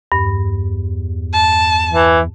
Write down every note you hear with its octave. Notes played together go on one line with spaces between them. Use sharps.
E2 G2
A5
E3